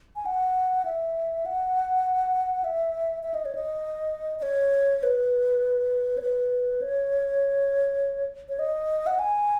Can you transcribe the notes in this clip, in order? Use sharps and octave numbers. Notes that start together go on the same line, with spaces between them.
G#5
F#5
E5
F#5
E5
E5
D#5
C#5
D#5
D#5
C#5
B4
C#5
B4
C#5
C#5
D#5
F#5
G#5